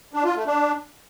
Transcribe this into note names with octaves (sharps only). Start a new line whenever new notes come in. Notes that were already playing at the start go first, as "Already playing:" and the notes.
D4
F4
A3
D4